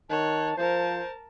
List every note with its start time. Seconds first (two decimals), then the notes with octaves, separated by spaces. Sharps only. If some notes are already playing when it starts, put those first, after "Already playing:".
0.10 D#3 C#5 A5 F#6
0.57 F3 A#4 C5 A5